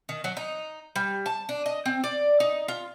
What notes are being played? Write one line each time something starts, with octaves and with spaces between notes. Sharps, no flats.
D#3
F#3
D#4
G3
A5
D4
D#5
C4
D5
D#4
F4